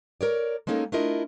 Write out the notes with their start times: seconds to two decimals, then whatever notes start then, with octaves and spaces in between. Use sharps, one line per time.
0.21 A#4 C#5 D5
0.67 G#3 A#3 C#4 D#4 A4 A#4
0.92 A3 D4 E4 F4 A#4 D#5